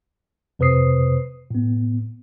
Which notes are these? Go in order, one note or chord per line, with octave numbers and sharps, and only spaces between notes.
F2 C3 B4 C5 D#6 C7
A2 B3